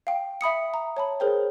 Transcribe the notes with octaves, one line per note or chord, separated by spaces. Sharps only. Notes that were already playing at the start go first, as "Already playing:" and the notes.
F5 G5
E5 B5 D#6 C#7
A#5
C#5 A5 B5
G#4 A#4 C5 C#5 G5